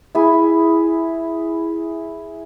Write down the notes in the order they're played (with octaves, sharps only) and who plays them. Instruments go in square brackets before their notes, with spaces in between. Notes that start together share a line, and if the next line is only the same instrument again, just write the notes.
[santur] E4 G#4